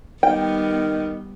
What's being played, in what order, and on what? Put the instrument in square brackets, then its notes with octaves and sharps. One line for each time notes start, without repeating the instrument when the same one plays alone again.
[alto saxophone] D#3 [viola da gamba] G3 B3 [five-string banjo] G5